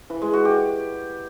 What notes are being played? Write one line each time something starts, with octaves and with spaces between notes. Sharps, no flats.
E3
G#3
F#4
G4